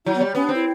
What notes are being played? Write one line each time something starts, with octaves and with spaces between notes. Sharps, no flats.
F#3 E4
B3
G3
B3 C#4
D4
C4
E4